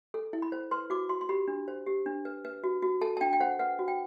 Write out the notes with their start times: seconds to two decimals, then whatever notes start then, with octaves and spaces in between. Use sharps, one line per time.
0.14 A4
0.33 E4
0.42 B5
0.52 C5
0.71 B4 C6
0.90 F#4 D6
1.09 F#4 C6
1.21 C6
1.29 G4 B5
1.48 D4
1.68 C5
1.87 G4
2.06 D4
2.25 B4
2.45 B4
2.64 F#4
2.82 F#4
3.01 A4 A5
3.17 A5
3.21 D4 G5
3.33 G5
3.40 C5 F#5
3.59 B4 F#5
3.79 F#4
3.88 G5